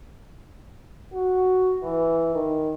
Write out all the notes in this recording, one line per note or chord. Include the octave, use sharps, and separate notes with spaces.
F#4
E3
D#3